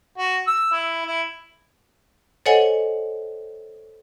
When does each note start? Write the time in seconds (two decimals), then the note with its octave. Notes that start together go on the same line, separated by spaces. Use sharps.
0.18 F#4
0.47 E6
0.72 E4
1.05 E4
2.46 A4 C5 C#5 D#5 F#5 G#5